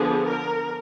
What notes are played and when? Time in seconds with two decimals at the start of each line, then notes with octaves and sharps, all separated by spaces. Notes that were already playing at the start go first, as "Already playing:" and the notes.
Already playing: D3 F3 B3 G#4
0.29 A#4